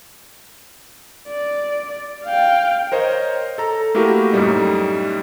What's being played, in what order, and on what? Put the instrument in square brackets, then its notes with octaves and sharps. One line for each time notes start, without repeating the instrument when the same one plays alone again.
[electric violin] D5
F5 G5
[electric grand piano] A#4 C5 C#5 D#5 A#5
A4 A#5
A3 A#3 E4 F#4 G4 A#4
F#2 A2 G3 D#4